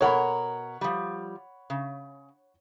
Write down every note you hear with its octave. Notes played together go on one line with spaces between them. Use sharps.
B2 A#4 C#5 F#5 A#5 B5
F3 G3
C#3